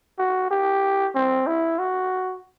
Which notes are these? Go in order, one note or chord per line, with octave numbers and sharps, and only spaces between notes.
F#4
G4
C4
E4
F#4